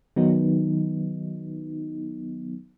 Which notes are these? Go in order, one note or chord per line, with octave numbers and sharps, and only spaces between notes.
D#3 F#3 B3 D#4